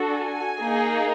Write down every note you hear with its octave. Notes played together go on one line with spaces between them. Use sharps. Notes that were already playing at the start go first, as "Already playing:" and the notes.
Already playing: D4 F#4 A4
G#5
A#3 D#4 G#4